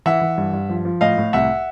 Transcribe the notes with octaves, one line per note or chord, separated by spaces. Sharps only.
E3 E5 F#5
E3
G2
G2
F3
F3
A2 D#5 F5
A2
C2 E5 F#5